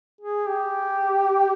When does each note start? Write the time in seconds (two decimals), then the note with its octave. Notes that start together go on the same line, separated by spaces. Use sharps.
0.21 G#4
0.47 G4